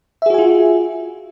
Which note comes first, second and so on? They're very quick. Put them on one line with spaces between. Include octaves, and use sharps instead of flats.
E5 G#4 F#4 G#5 F4